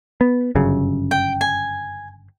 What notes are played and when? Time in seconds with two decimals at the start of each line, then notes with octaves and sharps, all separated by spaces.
0.21 B3
0.55 G1 F#2 C#3
1.11 G5
1.41 G#5